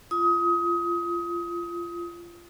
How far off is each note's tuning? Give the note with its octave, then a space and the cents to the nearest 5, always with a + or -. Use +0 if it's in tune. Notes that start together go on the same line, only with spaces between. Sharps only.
F4 -20 D#6 +25